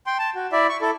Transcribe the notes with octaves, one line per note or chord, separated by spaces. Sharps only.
G5 C6
A5
F#4
E4 D5 E5
C#6
E4 A4